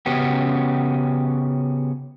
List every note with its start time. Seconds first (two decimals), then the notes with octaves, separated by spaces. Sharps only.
0.06 C#3 B3 C#4 F#4 G4